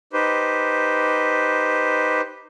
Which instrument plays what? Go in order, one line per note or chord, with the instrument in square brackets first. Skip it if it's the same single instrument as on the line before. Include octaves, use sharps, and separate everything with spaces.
[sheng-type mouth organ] D#4 G4 B4 C5